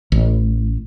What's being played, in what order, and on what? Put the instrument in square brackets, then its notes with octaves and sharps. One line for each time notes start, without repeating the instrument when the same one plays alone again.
[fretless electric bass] A1